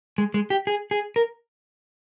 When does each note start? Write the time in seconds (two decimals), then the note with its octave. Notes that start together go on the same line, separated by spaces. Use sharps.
0.18 G#3
0.34 G#3
0.50 G4
0.67 G#4
0.91 G#4
1.16 A#4